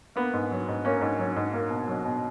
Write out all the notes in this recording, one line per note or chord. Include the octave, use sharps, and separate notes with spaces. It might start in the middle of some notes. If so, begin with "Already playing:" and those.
A#3 B3
G#2
F#3
G#2
A#3 C#4
G#2
F#3
G#2
A#3
B2
F#3
B2